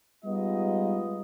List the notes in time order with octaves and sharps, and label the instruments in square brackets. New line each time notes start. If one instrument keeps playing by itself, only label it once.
[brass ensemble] G3 G#3 B3 D#4 F4 D#5